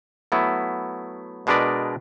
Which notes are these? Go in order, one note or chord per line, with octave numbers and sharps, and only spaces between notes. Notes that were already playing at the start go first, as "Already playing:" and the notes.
F#3 A3 B3 E4
B2 G#3 D4 A#4 B4 D5